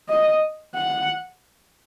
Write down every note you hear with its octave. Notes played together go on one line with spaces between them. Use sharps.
D#5
F#5